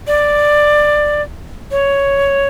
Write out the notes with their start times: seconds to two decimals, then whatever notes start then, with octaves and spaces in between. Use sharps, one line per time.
0.07 D5
1.71 C#5